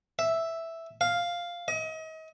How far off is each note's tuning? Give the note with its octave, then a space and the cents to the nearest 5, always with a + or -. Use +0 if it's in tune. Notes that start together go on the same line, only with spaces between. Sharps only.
E5 +0
F5 +0
D#5 +35